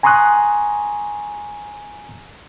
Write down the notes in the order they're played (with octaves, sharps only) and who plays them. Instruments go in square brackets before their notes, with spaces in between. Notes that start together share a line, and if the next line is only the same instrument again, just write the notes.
[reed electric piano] G#5 A#5 C6 C#6 D#6 F#6